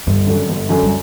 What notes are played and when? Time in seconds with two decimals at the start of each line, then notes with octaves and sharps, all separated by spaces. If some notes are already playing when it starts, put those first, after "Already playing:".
0.07 G1 G2
0.27 F#2 D3
0.49 G1
0.69 F#2 D3
0.82 G3